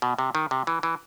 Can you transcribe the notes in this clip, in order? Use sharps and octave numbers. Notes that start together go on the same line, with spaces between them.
B2
C3
D#3
C3
E3
E3